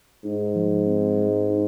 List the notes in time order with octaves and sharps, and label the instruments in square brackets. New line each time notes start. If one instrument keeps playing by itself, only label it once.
[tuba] G#2 [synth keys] D#4
[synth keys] F3
C4
G#3
D#4